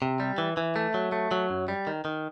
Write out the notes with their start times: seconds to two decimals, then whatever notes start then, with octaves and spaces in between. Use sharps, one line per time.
0.02 C3
0.20 G3
0.38 E3
0.57 E3
0.76 A3
0.94 F#3
1.12 A3
1.31 F#3
1.50 F#2
1.68 G3
1.87 D#3
2.05 D#3